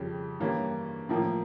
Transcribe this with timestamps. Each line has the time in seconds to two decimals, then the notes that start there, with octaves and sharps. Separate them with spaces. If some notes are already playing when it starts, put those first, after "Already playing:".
Already playing: F2 C#3 G3
0.40 G2 E3 G3 A#3 C#4
1.09 A2 F3 A#3